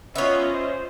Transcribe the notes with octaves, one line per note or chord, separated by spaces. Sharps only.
B3 C#4 F4 C#5 D#5 E5
C5